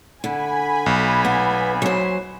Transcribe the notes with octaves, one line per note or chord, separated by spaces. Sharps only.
D3 G#5 B5
B1
B3
F#3 C5